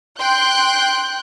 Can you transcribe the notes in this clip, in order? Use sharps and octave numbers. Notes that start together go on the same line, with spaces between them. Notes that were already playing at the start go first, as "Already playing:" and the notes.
G5 C6 F#6 G6